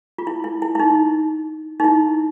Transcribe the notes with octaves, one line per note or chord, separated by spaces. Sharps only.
F4
E4
E4
E4
E4
D#4
D#4
E4